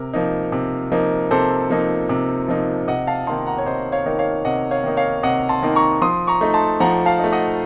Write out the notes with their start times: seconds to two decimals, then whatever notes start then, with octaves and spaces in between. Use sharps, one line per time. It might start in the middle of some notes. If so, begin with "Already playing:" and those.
Already playing: C3 A#4
0.13 F3 A#3 D#4
0.52 C3
0.92 F3 A#3 D#4
1.31 C3 A4 C5
1.70 F3 A#3 D#4
2.09 C3
2.48 F3 A#3 D#4
2.88 C3 D#5 F#5
3.07 F5 A5
3.27 D#3 A#3 D#4 A5 C6
3.46 F#5 A#5
3.58 C#5
3.66 C3 C5 D#5
3.92 C#5 F5
4.06 D#3 A#3 D#4
4.19 C#5 F5
4.45 C3 D#5 F#5
4.71 C#5 F5
4.84 D#3 A#3 D#4
4.97 C#5 F5
5.23 C3 D#5 F#5
5.49 A5 C6
5.63 D#3 A#3 D#4
5.75 A#5 C#6
6.01 F3 C6 D#6
6.27 A#5 C#6
6.41 A3 D#4
6.54 A5 C6
6.80 F3 F#5 A#5
7.06 F5 A5
7.19 A3 D#4
7.33 D#5 F#5